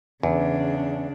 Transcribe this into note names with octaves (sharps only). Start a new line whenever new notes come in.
E2 C#3 D4